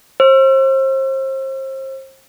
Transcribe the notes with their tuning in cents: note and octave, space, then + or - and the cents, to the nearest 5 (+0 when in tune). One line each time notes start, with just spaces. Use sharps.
C5 +35 E6 +40